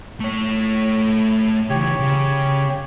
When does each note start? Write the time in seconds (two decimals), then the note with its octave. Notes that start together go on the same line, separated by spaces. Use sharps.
0.20 A3 C#5
1.70 C#3 E3 G4 C#5
2.00 C#3